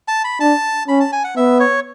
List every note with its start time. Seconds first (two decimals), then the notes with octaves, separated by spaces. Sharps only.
0.08 A5
0.24 B5
0.40 D4 A5
0.88 C#4 B5
1.00 A5
1.12 G#5
1.24 F#5
1.36 B3 E5
1.60 C#5